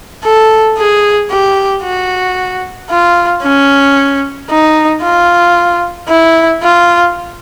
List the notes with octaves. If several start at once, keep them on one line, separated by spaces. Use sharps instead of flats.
A4
G#4
G4
F#4
F4
C#4
D#4
F4
E4
F4